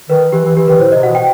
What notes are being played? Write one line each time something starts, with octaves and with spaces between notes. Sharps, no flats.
D#3 B4
E3 G4
E3
E3 G4
D#3 B4
A2 C5
D#5
C3
B2 F#5
G5